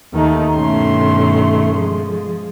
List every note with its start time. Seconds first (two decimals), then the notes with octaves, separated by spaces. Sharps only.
0.13 D#2 D#3 A3 D#4
0.55 G2 B2 D#3 A3 C#4 C6
1.75 F3 G#3